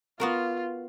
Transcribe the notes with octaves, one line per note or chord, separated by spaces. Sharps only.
B3 F4 F#4 A#4